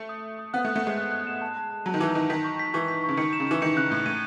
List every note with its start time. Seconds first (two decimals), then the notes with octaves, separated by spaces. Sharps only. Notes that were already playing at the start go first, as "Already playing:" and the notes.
Already playing: A3
0.09 D#6
0.24 D#6
0.39 D#6
0.53 B3 F#6
0.64 A3
0.68 F#6
0.76 A3
0.83 G#3 F#6
0.98 F#6
1.12 F#6
1.27 E7
1.42 A5
1.57 A5
1.70 A5
1.86 F#3 A5
1.94 D#3
2.00 E3 A5
2.15 D#3 A5
2.30 D#3 B6
2.44 C#6
2.59 B6
2.74 E3 C#6
2.88 B6
3.04 C#3 C#6
3.17 D#3 C#7
3.33 E7
3.40 C#3
3.47 E3 E7
3.62 D#3 C#7
3.77 C#3 F#6
3.91 A2 F#6
4.05 A2 D#7